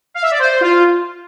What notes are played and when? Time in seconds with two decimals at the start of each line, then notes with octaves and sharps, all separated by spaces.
0.14 F5
0.22 E5
0.31 D5
0.39 C5
0.61 F4